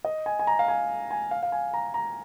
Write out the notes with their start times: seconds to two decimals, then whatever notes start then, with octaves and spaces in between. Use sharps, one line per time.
0.04 D#5
0.26 G#5
0.39 G#5
0.47 A#5
0.59 F5
0.68 G#5
1.11 G#5
1.31 F5
1.43 F5
1.52 G#5
1.74 A#5
1.94 A#5